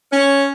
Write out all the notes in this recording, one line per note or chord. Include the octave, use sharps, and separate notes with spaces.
C#4